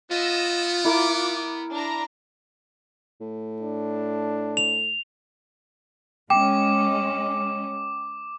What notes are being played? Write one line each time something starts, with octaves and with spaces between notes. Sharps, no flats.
B3 F4 D#5 E6
E4 A#4 D6 D#6
D4 A#5
A2
D4
F7
G#3 C#4 G5 D6